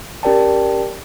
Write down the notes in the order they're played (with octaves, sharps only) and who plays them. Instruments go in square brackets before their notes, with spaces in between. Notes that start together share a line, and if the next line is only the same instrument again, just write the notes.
[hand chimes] C#4 G4 A#4 D5 G5 A5